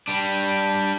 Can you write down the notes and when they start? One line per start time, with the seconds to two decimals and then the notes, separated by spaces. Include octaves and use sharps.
0.08 G3 D4